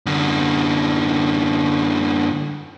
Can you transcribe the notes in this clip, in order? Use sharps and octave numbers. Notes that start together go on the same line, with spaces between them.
F#2 D3